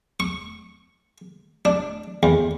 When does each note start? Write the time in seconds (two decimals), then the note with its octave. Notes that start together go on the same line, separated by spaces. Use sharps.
0.20 C#6
1.65 D4
2.23 E2